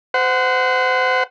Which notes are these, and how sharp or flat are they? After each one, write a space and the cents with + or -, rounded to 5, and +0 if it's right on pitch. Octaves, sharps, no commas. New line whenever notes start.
C5 -30 F#5 +0